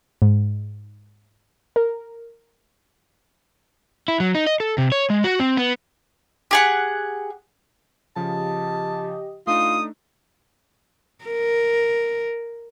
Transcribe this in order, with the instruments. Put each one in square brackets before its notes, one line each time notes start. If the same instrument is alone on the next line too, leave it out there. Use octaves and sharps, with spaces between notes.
[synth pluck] G#2
A#4
[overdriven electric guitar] E4
F#3
D#4
D#5
A4
C3
C#5
G#3
F#4
C4
B3
[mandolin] G4 G#4 F#5
[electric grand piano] C#3 F3 [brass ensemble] G4 D#5 [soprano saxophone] A5
[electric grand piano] A3 D4 D#4 [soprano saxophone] F4 [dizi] D#6
[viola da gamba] A#4